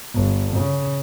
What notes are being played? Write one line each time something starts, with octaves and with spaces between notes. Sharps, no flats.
G1
C#3